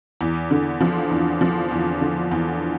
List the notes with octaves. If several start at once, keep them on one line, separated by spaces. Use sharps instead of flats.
E2
D3
F3
E2
F3
E2
D3
E2